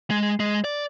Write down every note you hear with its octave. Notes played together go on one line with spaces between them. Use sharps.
G#3
G#3
D5